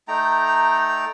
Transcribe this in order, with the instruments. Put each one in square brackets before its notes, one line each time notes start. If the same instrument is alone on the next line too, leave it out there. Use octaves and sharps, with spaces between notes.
[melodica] A3 D#4 G5 A#5